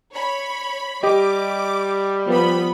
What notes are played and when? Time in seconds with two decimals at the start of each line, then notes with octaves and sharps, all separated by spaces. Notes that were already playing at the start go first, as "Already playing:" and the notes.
0.13 C#5 B5
1.03 G3 G4 D#5 D6
2.27 F3 B3 B5